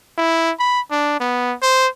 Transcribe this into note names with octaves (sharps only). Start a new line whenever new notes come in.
E4
B5
D4
B3
C5